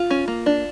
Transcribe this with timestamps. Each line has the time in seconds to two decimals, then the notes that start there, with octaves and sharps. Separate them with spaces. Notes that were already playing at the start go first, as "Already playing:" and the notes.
Already playing: F4
0.11 C#4
0.28 A#3
0.46 D4